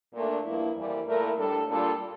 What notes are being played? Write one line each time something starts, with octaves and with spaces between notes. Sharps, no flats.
A#2 A3 D4
G2 F3 A#3 E4
F2 E3 G3 A#3
A#2 A3 E4 A#4
A2 G3 D4 A4
A#2 G3 D4 F4 A4